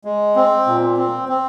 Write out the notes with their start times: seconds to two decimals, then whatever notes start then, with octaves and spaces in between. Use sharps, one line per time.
0.05 G#3
0.36 C4
0.67 A#2
0.97 C4
1.29 C4